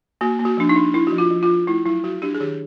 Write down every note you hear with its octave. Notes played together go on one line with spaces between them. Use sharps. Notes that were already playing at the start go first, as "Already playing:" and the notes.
A#3 F#4
A#3
F#4
F3 D4
D#4
D4
D4 E4
F#4
F3
F4
F3
F4
F3
A3 E4
F#3 E4
F#3 F#4
D4 G4
G#4
D#3 G4